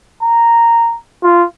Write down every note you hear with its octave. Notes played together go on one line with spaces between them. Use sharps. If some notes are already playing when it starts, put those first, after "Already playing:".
A#5
F4